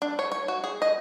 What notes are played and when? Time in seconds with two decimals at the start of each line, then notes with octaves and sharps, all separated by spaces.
0.02 D4
0.19 C#5
0.32 C#5
0.48 F#4
0.64 G#4
0.82 D#5